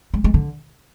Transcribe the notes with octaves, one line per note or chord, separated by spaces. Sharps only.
G#3
G#3
D3